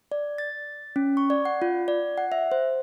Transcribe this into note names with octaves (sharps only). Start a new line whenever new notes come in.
D5
A6
C#4
C#6
D5
F#5
F4
D5
F#5
E5
C5